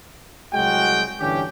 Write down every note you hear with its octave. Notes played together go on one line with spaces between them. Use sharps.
C2 F#3 G#3 F#4 G5
G1 D3 E3 C#4 G4